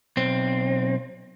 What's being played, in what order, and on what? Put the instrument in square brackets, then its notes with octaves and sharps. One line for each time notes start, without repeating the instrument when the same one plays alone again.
[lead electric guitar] B1 C4